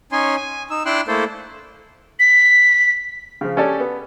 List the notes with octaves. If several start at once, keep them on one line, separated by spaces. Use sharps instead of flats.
C#4 D#4 C#5 G#5 C6
G#5
D#4 E6
D4 E4 G5 C6 E6 F#6
A3 A#3 E4 A4 C5
B6
C#3 F3
C#4 G4 A4 C#5 D5
B3